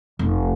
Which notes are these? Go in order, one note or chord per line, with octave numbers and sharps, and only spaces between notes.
F1